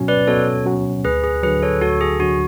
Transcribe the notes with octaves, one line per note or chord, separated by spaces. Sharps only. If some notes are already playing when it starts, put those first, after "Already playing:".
Already playing: B2 F#3 C#4 F#4
B4 D5
B2 A4 C#5
F#3 C#4 F#4
D2 G#4 B4
G#4
D3 F#3 G#4 B4
A4 C#5
D2 F#4 A4
G#4
D3 F#3 F#4